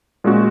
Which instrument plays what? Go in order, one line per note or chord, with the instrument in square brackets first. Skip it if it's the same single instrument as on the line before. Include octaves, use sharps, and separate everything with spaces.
[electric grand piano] A#2 G#3 C#4 F#4